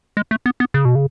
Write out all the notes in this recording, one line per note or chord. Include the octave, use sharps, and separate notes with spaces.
G#3
A3
B3
B3
C#3
B2
C#3